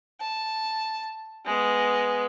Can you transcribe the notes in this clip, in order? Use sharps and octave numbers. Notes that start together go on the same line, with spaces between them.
A5
G#3 B3